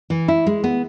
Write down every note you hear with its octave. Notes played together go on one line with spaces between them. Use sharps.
E3
E4
G#3
B3